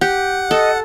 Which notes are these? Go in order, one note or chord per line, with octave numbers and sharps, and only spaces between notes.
G4 F#5
A4 D#5